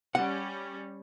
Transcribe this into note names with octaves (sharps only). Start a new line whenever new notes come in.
G3 C#4 F#5